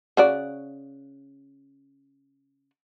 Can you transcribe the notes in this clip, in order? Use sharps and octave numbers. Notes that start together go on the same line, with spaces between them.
C#3 F#4 D5